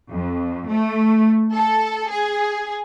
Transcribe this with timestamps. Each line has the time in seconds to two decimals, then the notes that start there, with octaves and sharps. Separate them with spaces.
0.11 F2
0.70 A3
1.53 A4
2.10 G#4